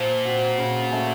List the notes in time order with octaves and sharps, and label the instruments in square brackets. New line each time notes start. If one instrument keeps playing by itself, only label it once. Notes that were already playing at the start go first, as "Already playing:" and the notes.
Already playing: [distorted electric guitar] A#2 [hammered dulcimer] F3 A#3
[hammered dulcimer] C4 F#4
C#3
A3 C#4